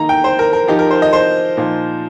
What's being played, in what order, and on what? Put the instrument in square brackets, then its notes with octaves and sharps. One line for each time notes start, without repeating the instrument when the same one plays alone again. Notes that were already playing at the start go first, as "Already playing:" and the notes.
Already playing: [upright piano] D#3 A#3 D#4 A#5
G5
C5
A#4
A#4
F3 D#4 G4
A#4
C5
D#5
C5
A#2 F3 D#4